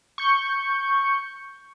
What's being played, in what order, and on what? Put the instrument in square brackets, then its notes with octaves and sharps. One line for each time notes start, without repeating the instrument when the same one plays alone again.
[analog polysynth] C#6 G6